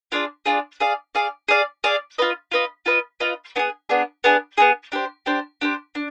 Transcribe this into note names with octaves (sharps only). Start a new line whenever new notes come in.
D4 F4 G#4 D5
D4 F4 G#4 D5
G#4 D5 F5
G#4 D5 F5
G#4 D5 F5
G#4 D5 F5
F4 B4 D#5
F4 B4 D#5
F4 B4 D#5
F4 B4 D#5
B3 D4 G#4
B3 D4 G#4
B3 D4 G#4
B3 D4 G#4
D4 G4 C5
D4 G4 C5
D4 G4 C5
D4